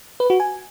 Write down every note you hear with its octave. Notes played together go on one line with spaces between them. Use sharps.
B4
F#4
G#5